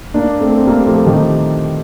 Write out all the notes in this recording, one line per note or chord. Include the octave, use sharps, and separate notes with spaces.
A#3 D4
A3 C4
C4
G3 A#3
F3 A3
D#3 G3